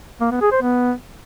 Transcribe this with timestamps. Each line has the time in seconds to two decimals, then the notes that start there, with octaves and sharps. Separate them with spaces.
0.21 A#3
0.31 B3
0.41 G#4
0.52 C5
0.62 B3